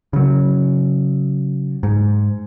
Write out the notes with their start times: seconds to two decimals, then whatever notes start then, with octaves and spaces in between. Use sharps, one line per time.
0.13 C#3 F#3
1.83 G#2